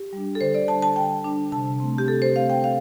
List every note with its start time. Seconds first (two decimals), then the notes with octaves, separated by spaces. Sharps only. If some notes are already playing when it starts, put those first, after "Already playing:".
Already playing: G4
0.13 G3 D4
0.35 A4
0.41 D3 C5
0.54 D5
0.68 G3 D4 A5
0.82 A5
0.96 D3 G5
1.24 G3 D4
1.52 C3 A5
1.80 A3 C4
1.98 G4
2.08 C3 A4
2.22 C5
2.36 A3 C4 F5
2.50 G5
2.64 F5